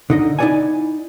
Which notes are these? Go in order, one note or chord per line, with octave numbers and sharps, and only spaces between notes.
D3 D#4 D#5
D#4 E4 A4 D5 F#5 G#5